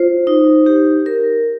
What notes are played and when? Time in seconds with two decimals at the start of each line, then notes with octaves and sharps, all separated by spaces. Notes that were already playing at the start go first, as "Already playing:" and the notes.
Already playing: F4 C5
0.27 D#4
0.66 G4
1.06 A#4